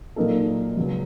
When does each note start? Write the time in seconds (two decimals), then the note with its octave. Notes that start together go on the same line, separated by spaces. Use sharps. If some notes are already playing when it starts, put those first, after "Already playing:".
0.16 A#2 F#3 A#3 D#4 A4
0.77 C#2 C#3 F#3